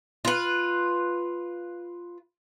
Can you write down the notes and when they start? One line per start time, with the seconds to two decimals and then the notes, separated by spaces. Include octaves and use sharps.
0.25 F4 B4